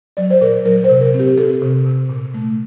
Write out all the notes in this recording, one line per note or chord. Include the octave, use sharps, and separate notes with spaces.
F#3 D5
C5
A#2 A#4
F#3 A#4
C5
C3
A#4
C4
G4
C4 A4
C3
C3
A#2
A3